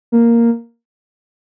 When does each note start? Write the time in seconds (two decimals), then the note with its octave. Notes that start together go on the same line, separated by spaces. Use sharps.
0.12 A#3